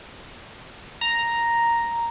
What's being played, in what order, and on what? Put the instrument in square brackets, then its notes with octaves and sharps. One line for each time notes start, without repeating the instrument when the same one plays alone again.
[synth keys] A#5